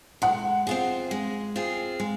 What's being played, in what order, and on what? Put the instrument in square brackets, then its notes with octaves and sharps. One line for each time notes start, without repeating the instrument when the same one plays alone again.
[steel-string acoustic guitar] G#3 [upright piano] F#5
[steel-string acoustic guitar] C4 F4 G#4
G#3
C4 F4 G#4
G#3